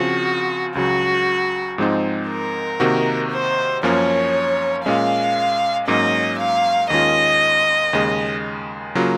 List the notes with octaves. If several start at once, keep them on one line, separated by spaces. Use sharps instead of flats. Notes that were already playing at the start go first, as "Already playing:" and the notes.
Already playing: C#3 F3 C4 F4 F#4
C#2 C#3 F#3 F#4
G#2 F3 G#3 C4 D#4
A#4
C3 D#3 A#3 D#4 F#4
C5
F#2 F3 A#3 C#4 C#5
A#2 G#3 C#4 F5
G#2 F#3 A#3 C#4 D#5
F5
D#2 D#3 G#3 C#4 F4 D#5
D#2 C#3 G#3
C#3 F#3 A#3 F4